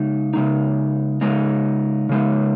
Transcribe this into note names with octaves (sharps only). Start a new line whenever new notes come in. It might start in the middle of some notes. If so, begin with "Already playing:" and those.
Already playing: C#3 G#3 D#4
C#3 G#3 D#4
C#3 G#3 D#4
C#3 G#3 D#4